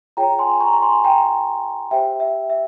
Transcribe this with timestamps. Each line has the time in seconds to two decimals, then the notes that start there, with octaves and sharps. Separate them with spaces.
0.17 F4 G#4 C#5 G5 A#5
0.39 G#5 C6
0.61 A#5 C#6
0.73 A#5
0.82 G#5 C6
1.04 G5 A#5
1.91 G4 C5 E5 G5
2.20 E5
2.50 E5